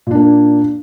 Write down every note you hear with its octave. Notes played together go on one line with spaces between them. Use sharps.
A#2 A#3 D4